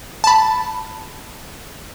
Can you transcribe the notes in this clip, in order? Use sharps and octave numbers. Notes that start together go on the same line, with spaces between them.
A5 B5